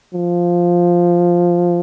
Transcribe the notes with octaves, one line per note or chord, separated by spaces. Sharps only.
F3